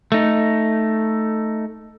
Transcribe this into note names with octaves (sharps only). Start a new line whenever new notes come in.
A3 D#4